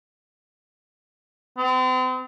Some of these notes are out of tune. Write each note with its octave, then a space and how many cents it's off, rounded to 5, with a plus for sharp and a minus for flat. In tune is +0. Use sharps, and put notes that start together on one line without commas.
C4 -40